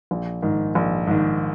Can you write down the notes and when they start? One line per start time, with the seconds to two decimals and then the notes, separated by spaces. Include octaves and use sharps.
0.11 A#1
0.42 G#2 D#3
0.75 A#1
1.07 G#2 D#3